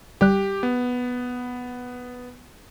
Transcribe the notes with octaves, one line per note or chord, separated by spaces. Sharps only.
G1 G3 G4 F#6
B3